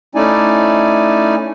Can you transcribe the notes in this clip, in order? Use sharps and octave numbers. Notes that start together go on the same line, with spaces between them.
A3 C#4 D#4 E4 D5 G#5